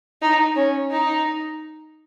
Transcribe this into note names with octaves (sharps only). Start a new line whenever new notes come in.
D#4
C#4
D#4